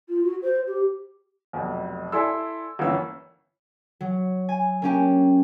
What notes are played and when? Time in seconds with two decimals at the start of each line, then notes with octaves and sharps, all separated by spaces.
0.09 F4
0.24 F#4
0.43 C5
0.67 G4
1.53 F1 B1 F2
2.12 E4 A4 D5 G#5 C6 E6
2.79 G1 E3 A#3 C#4 E6
4.01 F#3
4.49 G#5
4.82 A#3 C#4 G4